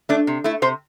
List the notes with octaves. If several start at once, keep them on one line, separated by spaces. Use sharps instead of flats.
A3 D4
C3
A3 E4
C3 C5